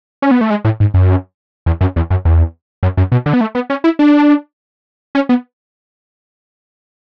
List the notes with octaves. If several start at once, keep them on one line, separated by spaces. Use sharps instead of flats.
C#4
B3
A3
G#3
A2
G#2
F#2
E2
F#2
E2
F#2
E2
F#2
F#2
B2
D3
B3
A3
B3
C#4
E4
D4
C#4
B3